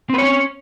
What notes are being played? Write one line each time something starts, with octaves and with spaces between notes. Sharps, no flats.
C4 C#4 B4 C#5